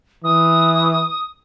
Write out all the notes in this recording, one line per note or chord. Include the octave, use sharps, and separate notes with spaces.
E3 D#6